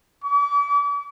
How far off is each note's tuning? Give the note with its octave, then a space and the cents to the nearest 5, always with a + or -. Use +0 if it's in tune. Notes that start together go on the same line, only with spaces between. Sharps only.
D6 -40